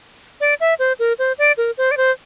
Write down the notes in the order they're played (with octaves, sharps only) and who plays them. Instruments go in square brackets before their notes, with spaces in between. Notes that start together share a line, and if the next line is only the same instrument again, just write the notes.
[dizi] D5
E5
C5
A#4
C5
D5
A#4
C5
D5
C5